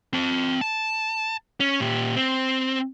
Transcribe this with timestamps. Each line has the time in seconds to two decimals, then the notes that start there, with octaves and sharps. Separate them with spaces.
0.13 C4 A5
0.61 A5
1.60 C#4
1.81 A#2 G4
2.16 C4